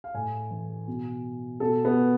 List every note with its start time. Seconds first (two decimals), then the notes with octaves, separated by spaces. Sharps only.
0.04 F5
0.14 A2 G#5
0.51 E3
0.88 B2
1.60 B2 A4
1.85 B3